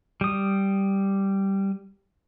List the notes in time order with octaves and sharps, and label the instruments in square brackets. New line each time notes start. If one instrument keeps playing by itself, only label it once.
[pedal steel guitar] G3 D#6